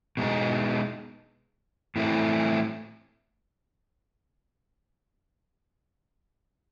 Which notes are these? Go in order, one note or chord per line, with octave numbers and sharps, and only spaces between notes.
B2 G#3 B3 D#4
A2 E3 A3 C4 E4